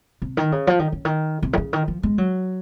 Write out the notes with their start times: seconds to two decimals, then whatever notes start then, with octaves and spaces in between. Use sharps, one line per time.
0.22 C3
0.37 D#3
0.52 C#3
0.67 F3
0.79 D#3
0.92 C#3
1.05 D#3
1.43 C3
1.53 D#3
1.57 C#3
1.73 D#3
1.88 F3
2.03 G#3
2.18 F#3